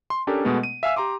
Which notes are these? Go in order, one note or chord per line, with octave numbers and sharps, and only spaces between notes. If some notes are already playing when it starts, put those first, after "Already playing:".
C6
C#4 D4 G4 A4 A#4
B2 G#3 A3 B3
D#7
E5 F5 G#5 E6
G4 A#5 C6 D6